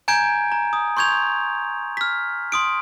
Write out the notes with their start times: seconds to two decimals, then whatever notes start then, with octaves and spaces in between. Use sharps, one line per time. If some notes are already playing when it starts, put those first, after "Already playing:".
0.08 G#5 A#5 G6 G#6 D7
0.52 A#5
0.73 D#6
0.97 C6 C#6 G6 G#6 F7
1.97 F6 B6
2.52 C6 D#6 D7